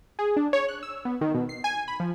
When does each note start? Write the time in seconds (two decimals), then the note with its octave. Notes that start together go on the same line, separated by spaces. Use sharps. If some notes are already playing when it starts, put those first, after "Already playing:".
0.19 G#4
0.36 D4
0.53 C#5
0.68 F#6
0.83 E6
1.05 B3
1.21 D#3
1.34 B2
1.49 C7
1.64 G#5
1.88 B5
2.00 F3